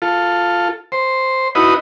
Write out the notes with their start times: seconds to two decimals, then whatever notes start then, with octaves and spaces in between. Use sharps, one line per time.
0.02 F4 A4
0.92 C5
1.55 D#4 E4 F#4 B4 D#5